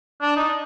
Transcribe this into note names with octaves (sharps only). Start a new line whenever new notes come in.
D4
D#4